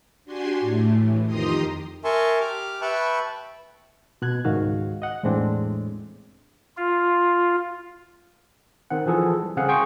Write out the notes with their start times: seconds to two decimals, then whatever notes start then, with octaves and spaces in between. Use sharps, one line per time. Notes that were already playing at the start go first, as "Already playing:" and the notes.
0.25 D4 F#4 G4 G#5 C6
0.60 A2 A3
0.93 A2 E3
1.26 F2 D#3 G4 A#5 C6 D#6
2.04 A#4 E5 G#5 A5 C6 C#6
2.40 G4 D6 F6
2.81 B4 E5 G5 A5 B5 C#6
4.22 B2 F#6 G#6
4.45 C#2 G#2 D#3 F#4 F5
5.02 D#5 F#5
5.23 E2 A2 G#3 C4 D4
6.77 F4
8.90 D#3 C4 F#5
9.06 E3 F3 G#4 A4
9.43 G3
9.57 C#3 C4 G#4 F5 F#5
9.68 G#4 F#5 G5 C6 C#6